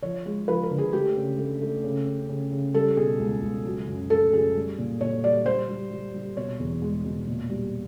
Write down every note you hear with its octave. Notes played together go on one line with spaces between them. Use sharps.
F3 C#5
G#3
F3 B4
A#4
D3
G#4
A3 G4
C#3
A3
A3
C#3
C#3
C#3
C#3
G3 A4
B2 G#4
C#2
C#2
F#3
F#2
A3 A4
F#2 G#4
G3
A#2
A#2 C#5
G3 D5
G3 C5
G3
G3
G3
B2 C#5
E2
G#3
B2
A#2
G3